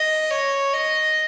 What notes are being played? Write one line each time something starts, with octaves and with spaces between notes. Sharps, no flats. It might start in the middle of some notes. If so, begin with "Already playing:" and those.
Already playing: D#5
C#5
D#5